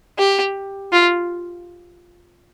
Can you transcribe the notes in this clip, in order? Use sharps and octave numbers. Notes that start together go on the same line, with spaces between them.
G4
F4